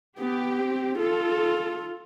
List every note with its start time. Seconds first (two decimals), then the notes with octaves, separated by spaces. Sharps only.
0.19 B3 G4
0.59 C4
0.98 F4 A4